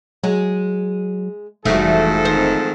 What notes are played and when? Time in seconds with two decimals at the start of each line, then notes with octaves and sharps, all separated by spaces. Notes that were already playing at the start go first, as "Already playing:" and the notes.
0.24 F#3 G#3
1.65 F1 G#2 E3 F3 G3 A3 F#4 A4
2.25 D#3 C4 C5